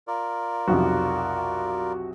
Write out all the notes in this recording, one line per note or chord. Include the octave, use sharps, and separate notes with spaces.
F4 A#4 D5
B1 F2 C3 F#4